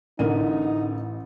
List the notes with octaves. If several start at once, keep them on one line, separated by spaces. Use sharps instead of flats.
A1 D3 D#4 A#4 D#7